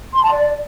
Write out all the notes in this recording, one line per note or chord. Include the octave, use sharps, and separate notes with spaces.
C6
A5
D5